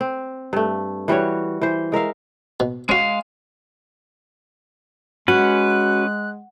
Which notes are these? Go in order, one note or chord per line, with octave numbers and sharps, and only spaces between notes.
C4
G2 A3
E3 G3 F#4 C#5
E3 C5
G#3 A#4 E5 F5
B2
G#3 C#4 F#4 F5
G#3 C#4 F#4 B4 F#6